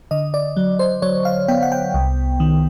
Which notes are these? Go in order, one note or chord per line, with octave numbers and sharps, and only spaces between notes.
D3 D#5
D5
F#3
C5
F#3 C#5
F5
B3 G5
F#5
G5
C2
D#3